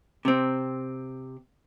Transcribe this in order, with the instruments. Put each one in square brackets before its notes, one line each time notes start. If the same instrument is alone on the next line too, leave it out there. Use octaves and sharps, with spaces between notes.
[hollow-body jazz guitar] C3 C4